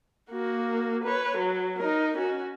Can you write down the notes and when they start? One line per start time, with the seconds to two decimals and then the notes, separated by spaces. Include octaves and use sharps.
0.30 A#3 F#4
1.04 B4 C#5
1.37 F#3
1.78 D#4 A#4
2.17 C#4 F#4